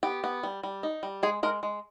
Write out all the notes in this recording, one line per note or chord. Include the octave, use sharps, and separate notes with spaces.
B3 G4
B3
G3
G3
D#4
G3
G#3 G#4
G#3 A#4
G#3